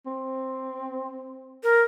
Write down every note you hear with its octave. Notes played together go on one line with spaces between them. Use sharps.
C4
A#4